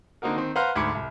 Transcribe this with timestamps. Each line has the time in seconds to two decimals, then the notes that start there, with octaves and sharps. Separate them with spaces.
0.22 D3 A#3 C4 D#4 F#4 A#4
0.36 D#3 C4
0.56 B4 C5 F5 F#5 A#5 F6
0.75 D2 G#2 B5 D6 G#6 C#7
0.95 C2